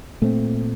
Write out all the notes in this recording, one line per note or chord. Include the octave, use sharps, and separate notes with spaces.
A#2 A3 C4